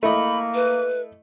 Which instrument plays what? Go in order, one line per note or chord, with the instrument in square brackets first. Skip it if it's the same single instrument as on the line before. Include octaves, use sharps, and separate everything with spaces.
[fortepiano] A3 E4 D#5 [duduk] A#3 [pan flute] B5
[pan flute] B4